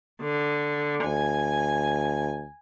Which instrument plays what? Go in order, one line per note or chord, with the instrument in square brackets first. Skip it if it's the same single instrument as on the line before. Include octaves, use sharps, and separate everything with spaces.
[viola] D3
[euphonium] D2 [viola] G#5